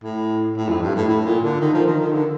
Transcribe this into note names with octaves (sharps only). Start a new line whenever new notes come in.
A2
A2
F2
G2
A2
A2
A#2
D3
D#3
F3
D#3
D#3
D3